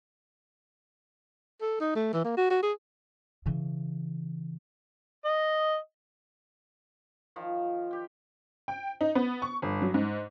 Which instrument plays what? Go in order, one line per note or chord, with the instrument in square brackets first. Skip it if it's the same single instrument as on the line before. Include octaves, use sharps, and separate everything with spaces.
[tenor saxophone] A4
D#4
A3
E3
A#3
F#4
F#4
G#4
[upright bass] C#3 E3
[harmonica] D#5
[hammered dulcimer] D#3 F3
G4 G5
[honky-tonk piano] G5
D#4
B3
C#6
G1
F#3
G#2